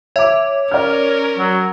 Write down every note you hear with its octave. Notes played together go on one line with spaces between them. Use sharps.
C#5 E5 D6
C#4 A#4 D5 F6
F#3